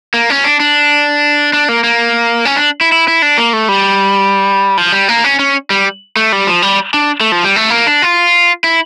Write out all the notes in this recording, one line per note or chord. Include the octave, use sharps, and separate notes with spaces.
A#3
C#4
D4
D4
D4
A#3
A#3
C#4
D4
E4
E4
E4
D4
A#3
A3
G3
F3
G3
A#3
C#4
C#4
G3
A3
G3
F3
G3
D4
A3
F3
G3
A3
A#3
D4
F4
E4